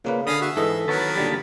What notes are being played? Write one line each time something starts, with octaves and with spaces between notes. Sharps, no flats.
A#2 C#3 A#3 B4
D3 G#4 F5 B5 D#6
F#4 E5
G#2 E3 A4 D#5
D#3 F#3 B3 A#4 C#5 F#5 A5 B5
A#2 D3 G3 G4